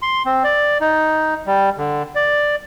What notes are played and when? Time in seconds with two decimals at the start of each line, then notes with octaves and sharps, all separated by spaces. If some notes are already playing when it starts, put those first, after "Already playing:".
0.02 C6
0.26 C4
0.44 D5
0.81 D#4
1.46 G3
1.78 D3
2.15 D5